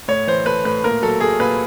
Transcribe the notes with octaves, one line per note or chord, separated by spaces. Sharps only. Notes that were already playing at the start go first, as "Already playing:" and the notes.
A2 C#5
E3 C5
A3 B4
A2 B4
A#2 A#4
F#3 A4
A3 G#4
A#2 B4